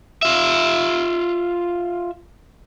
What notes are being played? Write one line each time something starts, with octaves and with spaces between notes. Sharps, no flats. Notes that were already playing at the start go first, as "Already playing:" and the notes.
F4 E5